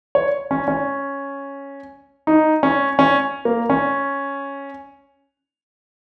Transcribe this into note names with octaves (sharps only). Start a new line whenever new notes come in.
C#5
C#4
C#4
D#4
C#4
C#4
A#3
C#4